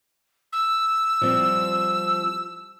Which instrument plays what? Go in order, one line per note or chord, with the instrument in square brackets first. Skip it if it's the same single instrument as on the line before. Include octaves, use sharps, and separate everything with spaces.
[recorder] E6
[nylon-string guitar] F3 G3 C4